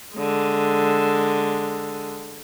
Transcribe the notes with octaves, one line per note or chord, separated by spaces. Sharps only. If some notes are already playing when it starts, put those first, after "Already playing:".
D3 G#3